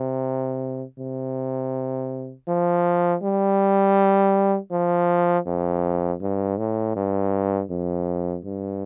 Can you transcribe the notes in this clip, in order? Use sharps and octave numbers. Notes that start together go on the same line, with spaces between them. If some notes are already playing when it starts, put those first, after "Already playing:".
Already playing: C3
C3
F3
G3
F3
F2
G2
A2
G2
F2
G2